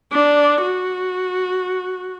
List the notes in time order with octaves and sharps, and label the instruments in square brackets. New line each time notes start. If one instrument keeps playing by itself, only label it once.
[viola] D4
F#4